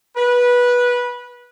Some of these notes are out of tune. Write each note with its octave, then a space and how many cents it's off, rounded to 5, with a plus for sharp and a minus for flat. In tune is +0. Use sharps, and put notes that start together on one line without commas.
B4 -15